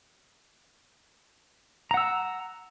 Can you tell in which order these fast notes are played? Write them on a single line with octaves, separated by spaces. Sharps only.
A#5 F#5 E6